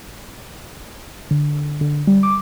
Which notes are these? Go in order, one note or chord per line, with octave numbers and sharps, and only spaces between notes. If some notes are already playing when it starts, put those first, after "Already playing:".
D3
D3
G3
D6